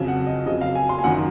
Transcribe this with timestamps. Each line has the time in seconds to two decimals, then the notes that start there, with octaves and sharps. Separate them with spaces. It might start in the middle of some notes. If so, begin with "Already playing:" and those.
Already playing: F2 C#3 F#3
0.08 F#5
0.26 D#5
0.46 F2 C#3 F#3 D#5
0.61 F5
0.75 G#5
0.89 C6
0.99 G#5
1.04 F#2 D#3 F#3 F#5